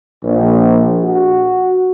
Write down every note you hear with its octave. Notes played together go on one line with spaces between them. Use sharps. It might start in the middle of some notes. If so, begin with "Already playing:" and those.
A#1
F#4